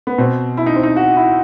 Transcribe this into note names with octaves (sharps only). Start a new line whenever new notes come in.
B3
B2 C4
E4
D#4
C4
D#4
F#4
E4